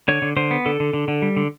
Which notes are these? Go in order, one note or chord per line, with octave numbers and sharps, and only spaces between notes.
D3 C#5
D3
D3 C5
B3
D3 A4
D3
D3
D3
G3
D3